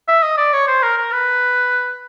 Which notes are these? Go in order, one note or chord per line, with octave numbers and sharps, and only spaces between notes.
E5
D#5
D5
C#5
C5
A#4
A#4
B4